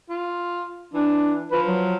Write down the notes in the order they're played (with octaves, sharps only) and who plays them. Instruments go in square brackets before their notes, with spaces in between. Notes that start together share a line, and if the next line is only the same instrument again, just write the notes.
[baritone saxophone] F4
[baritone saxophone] E3 [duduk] D4
[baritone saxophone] F3 [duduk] B4
[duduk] F#3